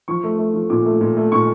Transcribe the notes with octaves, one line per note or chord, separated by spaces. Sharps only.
F3 C#6
A3
A3
F3
A#2 D6
A3
A#2
A3
A#2 C#6